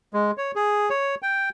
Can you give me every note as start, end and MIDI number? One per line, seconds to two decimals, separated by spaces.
0.13 0.31 56
0.38 0.52 73
0.56 0.89 68
0.90 1.15 73
1.22 1.49 79